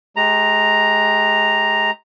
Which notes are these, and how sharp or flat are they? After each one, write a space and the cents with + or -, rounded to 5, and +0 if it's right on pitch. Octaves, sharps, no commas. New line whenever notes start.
G#3 +30 G4 +5 A#5 +0